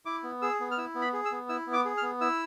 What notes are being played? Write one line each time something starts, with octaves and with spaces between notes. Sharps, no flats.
E4 D6
B3
G#4 E6
B3
F6
E4 E6
B3
B5
G#4
E6
B3
E4 E6
B3
D6
G#4
F6
B3
E4 E6